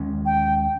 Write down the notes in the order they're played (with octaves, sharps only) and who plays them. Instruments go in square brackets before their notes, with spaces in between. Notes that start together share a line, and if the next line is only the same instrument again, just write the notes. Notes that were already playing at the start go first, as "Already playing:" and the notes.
Already playing: [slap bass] D#2 D#3 G#3 C#4
[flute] G5